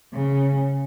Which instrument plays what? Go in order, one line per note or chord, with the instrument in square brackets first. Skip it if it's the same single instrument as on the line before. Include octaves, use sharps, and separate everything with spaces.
[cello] C#3